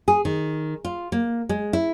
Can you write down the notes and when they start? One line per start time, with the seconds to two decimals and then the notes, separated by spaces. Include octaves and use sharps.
0.08 G#4
0.25 D#3
0.84 F4
1.12 A#3
1.49 G#3
1.73 E4